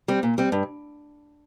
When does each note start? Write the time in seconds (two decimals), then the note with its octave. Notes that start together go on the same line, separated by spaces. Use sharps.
0.08 G3 C4
0.23 A#2
0.38 G3 C4
0.52 G2